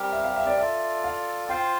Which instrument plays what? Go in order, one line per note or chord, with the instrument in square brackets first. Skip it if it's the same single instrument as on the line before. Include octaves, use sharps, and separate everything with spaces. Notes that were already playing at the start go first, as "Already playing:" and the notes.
Already playing: [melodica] G3 C4 G4 A#4
[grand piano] E5
F5
E5
D5
[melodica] F4 A4 D5 [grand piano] E5
[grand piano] F5
[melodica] F4 C5 F5 [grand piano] G5